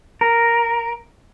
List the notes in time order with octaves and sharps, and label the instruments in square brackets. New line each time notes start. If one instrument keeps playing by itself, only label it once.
[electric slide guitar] A#4